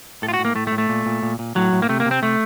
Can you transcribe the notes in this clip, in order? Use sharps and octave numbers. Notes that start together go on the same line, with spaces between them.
A2 A4
F4
F#4
A2
A#3
A2 A3
A3
A2
A3
A#2
A#2
A#2
A#2
A2 F#3
A2
A#3
C3 A3
A#3
C3
C4
C3 A3